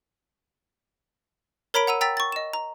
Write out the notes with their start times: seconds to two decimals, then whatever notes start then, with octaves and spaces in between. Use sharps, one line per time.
1.74 A#4 C#5 A#5 B5 B6 D7
1.87 F#5 A#5 E6 D#7
2.01 G5 A#5 E6 A6 B6
2.17 C#6 A6
2.32 D#5 E7
2.53 A#5